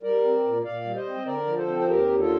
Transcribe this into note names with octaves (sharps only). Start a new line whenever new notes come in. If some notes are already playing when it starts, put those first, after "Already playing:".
G3 A#4 D5
C4
A#2
A#2 D5 F5
G3
C5 D#5
C4
D3 A#4 D5
F3
A4 C5
C4
C5
D#2 G4 A#4
D3
F4 A4